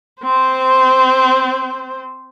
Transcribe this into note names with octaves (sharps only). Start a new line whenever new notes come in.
C4 C5